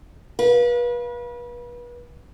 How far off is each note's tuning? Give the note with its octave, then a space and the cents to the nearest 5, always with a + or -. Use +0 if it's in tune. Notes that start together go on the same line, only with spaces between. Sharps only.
B4 -35 F5 +0